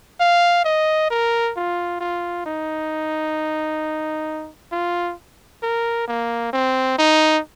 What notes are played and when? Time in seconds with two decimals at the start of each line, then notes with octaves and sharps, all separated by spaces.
0.20 F5
0.64 D#5
1.10 A#4
1.56 F4
2.01 F4
2.46 D#4
4.72 F4
5.63 A#4
6.08 A#3
6.53 C4
6.98 D#4